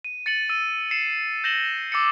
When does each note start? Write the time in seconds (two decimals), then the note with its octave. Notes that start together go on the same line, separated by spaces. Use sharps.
0.05 D#7
0.26 A6 C#7 D#7 F#7
0.50 E6 D#7
0.91 C7 C#7 E7
1.44 G6 A#6 E7 F#7 G7
1.92 D6 E6 A6 C#7